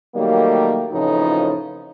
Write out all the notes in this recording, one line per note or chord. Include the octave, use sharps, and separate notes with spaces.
D#3 F#3 G3 A3 A#3
F2 A2 C#3 E3 F3 D#4